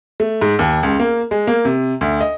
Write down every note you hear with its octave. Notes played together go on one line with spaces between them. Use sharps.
A3
G#2
D#2
C#2
A#3
G#3
A#3
C3
D2
D#5